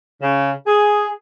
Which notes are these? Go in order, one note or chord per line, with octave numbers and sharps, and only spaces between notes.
C#3
G#4